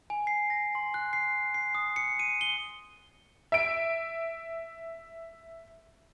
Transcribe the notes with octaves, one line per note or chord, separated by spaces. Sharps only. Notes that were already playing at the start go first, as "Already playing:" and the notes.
G#5
C7
A#6
C6
F#6
C7
C7
D#6
C#7
D#7
G7
E5 D7